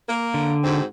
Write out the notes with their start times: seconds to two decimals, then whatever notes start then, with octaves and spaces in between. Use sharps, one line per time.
0.09 A#3
0.34 D3
0.64 G#2 C4 F#4